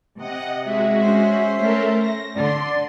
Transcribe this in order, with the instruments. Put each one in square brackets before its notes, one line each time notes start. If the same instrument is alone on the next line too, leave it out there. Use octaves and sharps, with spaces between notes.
[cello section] C3 [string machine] D#5 F#5
[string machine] G#3 F#4 [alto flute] E5
[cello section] C#4 C5
[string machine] A3 A4 A#4
A#6
[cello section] D3 [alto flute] D5 [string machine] C6